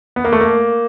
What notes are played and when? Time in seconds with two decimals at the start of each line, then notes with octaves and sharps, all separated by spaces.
0.16 B3
0.25 A#3
0.32 A3
0.41 A#3